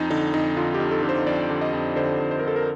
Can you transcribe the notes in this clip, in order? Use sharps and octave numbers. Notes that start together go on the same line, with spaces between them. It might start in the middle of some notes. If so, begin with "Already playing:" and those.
Already playing: F2 D#4
D3 D#4
F2 D#4
D3 F4
G4
F2
A4
D3
C5
F2 D5
D3
D#5
F2
D3 C5
F2
C5
D3 A#4
A4
A#4